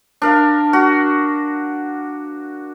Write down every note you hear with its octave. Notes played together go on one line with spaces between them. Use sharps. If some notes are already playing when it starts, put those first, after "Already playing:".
D4 A#4 F5
F#4